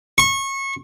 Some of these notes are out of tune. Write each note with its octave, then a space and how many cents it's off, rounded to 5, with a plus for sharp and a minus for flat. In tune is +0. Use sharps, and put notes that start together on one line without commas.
C#6 -25